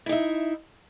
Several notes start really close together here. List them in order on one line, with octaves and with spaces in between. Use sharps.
E4 D#4 E5